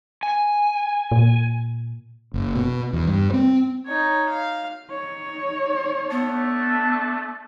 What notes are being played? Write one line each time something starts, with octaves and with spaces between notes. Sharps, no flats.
G#5
A#2
F#1
B2
E2
G2
C4
D#4 C#5
F5
D#4 C#5
A3 B3 D4 A5